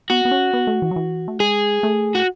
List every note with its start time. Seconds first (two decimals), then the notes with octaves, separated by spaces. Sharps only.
0.10 B3 F#4
0.25 B3
0.31 C#4
0.54 B3
0.67 A3
0.82 E3
0.91 F#3
0.96 E3
1.28 A3
1.40 G#3 G#4
1.83 A3
2.15 F#4